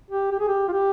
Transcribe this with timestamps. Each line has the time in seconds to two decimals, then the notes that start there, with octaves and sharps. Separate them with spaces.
0.11 G4
0.31 G4
0.40 G#4
0.48 G4
0.68 F4
0.72 G4